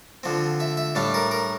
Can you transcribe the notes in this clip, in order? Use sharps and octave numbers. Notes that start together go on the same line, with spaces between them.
D3 F3 C4
E5
E5
A2 G3 D4 F5
A#4
A#4